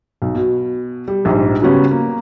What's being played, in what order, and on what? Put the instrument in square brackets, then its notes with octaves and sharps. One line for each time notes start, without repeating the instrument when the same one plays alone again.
[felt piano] B1
B2
G3
A#1 G#2 G3
C#3 F#3 G3 B3 C#4
A#3